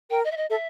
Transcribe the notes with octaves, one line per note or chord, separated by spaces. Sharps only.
A#4 G5
D#5
E5
D#5
A4 E5